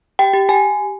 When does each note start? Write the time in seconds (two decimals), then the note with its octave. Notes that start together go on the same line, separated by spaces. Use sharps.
0.19 G4 G5
0.33 G4
0.49 G4 G#5